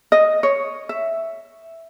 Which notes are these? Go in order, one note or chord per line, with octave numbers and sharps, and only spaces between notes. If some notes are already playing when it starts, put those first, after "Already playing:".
D#5
C#5
E5